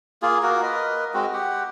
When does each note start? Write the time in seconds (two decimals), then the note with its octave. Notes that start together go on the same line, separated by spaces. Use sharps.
0.22 A#3 F4 G#4
0.43 A#3 F#4 A#4
0.62 A#4 B4 D#5
1.14 G#3 C4 F#4
1.33 G4 F#5